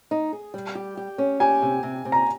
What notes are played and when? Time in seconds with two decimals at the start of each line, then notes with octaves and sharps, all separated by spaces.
0.11 D#4
0.33 G#4
0.54 G3
0.75 G4
0.97 G4
1.18 C#4
1.40 G4 G#5
1.62 C3
1.83 C3
2.05 C3
2.12 A#5